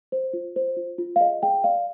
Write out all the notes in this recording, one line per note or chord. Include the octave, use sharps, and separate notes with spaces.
C5
F4
C5
F4
F4
F5
G#4 D#5
G#4 G5
D5 F5